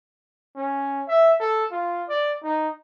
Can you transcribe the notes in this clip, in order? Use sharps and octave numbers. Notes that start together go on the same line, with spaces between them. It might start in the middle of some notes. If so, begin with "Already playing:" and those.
C#4
E5
A4
F4
D5
D#4